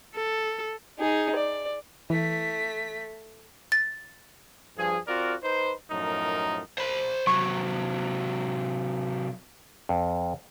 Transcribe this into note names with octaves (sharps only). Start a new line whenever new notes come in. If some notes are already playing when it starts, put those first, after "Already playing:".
A4
D#4 G#4
D5
E3 A3 B6
A6
G2 F3 G#4
C4 F4 F#4 A#4 D5
D#4 B4 C5
F#2 A2 F3 D#4 A#4
C5 B5
C3 F#3 C#6
F2